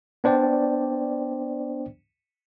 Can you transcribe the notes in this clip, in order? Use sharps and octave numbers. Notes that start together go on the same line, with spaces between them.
B3 D4 C5 D5 G5